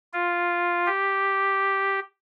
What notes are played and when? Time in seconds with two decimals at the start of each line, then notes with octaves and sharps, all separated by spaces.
0.13 F4
0.86 G4